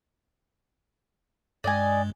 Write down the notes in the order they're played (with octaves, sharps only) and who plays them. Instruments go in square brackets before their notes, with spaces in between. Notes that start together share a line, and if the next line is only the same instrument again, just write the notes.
[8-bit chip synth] G2 G#3 [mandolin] D5 D#5 G#5